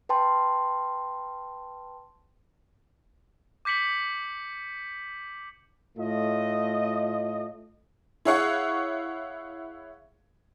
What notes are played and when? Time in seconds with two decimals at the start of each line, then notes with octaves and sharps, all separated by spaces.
0.09 B4 G5 A5 C6
3.65 D6 G6 B6 C#7 F#7
5.98 A2 A3 F4 D#5
8.25 E4 G#4 C#5 F5 F#5 C#6